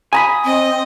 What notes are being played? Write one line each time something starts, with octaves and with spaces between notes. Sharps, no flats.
G#5 A#5 B5 D#6
C4 D#5